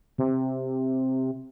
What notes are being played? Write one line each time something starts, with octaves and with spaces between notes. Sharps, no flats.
C3